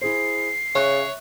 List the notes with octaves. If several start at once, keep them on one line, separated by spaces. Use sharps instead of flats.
E4 G#4 C5 C7
C#3 C#5 E5 C#6 F#6